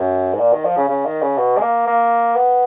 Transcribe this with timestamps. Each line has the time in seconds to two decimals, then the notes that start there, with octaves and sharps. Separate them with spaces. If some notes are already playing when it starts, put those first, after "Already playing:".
Already playing: F#2
0.33 G#2
0.40 A#2
0.53 D#3
0.65 F3
0.77 C#3
0.89 C#3
1.05 D#3
1.22 C#3
1.37 B2
1.57 G#3
1.62 A#3
1.87 A#3
2.36 B3